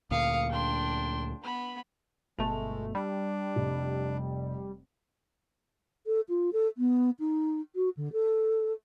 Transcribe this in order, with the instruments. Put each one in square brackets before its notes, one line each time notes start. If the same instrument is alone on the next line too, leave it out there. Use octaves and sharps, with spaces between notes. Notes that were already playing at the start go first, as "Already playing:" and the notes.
[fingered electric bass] D2 A#2 [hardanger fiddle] F5 [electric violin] D#6 C#7
[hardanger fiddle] D4 [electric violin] G5 C6
[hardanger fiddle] B3 [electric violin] B5
[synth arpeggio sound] G1 B2 A3 [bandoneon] G#3 [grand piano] F7
[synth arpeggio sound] G3 [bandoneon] D4
[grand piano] F1
[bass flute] A4
F4
A4
B3
D#4
F#4
D3
A4